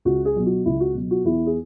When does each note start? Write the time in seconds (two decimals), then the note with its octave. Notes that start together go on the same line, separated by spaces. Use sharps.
0.05 C#2 F#4
0.25 G#4
0.36 B2 F#3
0.46 F#4
0.65 C#2 E4
0.80 F#4
0.95 B2 F#3
1.11 F#4
1.25 E2 E4
1.46 G#4